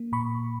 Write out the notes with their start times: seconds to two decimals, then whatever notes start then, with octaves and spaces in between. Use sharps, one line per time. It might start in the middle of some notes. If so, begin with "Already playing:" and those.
Already playing: A#3
0.12 A#2 B5 C#6